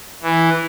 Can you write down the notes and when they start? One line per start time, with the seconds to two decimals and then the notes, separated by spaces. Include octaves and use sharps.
0.22 E3